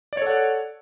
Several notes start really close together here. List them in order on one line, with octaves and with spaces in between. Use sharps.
D5 C#5 A4 F#5